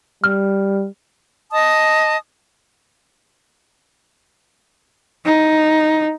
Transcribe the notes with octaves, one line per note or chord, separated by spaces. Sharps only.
G3 F6
D#5 A5 D#6
D#4